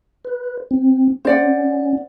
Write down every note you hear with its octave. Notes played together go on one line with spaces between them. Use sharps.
B4
C4
C#4 C5 D5 F#5